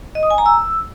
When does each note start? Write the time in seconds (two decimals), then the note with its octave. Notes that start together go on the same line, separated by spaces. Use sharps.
0.15 D#5
0.23 D#6
0.30 G#5
0.38 A#5
0.46 E6